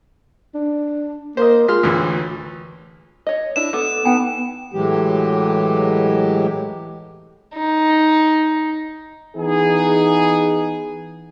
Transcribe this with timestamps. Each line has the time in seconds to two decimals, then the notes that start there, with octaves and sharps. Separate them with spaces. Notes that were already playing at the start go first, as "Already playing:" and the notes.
0.55 D4
1.37 A#3 C5 D#5
1.68 G#3 F4 C6 F6
1.83 D2 A2 E3
3.27 C#5 D#5
3.56 D4 E4 E7
3.73 B3 A4 D6 E6
4.05 B3 D#4 G5 G#5
4.73 A2 E3 F#3 G#3 G4
7.55 D#4
9.36 E3 B3 D#4 G#4